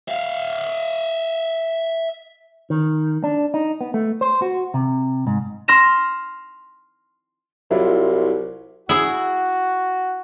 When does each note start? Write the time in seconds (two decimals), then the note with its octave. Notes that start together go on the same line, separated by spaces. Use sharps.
0.08 E5 F5
2.70 D#3
3.24 D4
3.54 D#4
3.81 B3
3.94 A3
4.21 C5
4.42 F#4
4.74 C3
5.27 G#2
5.68 C6 F6 A#6 E7
7.71 C2 F#3 E4 F4
8.89 E4 F#4 G#4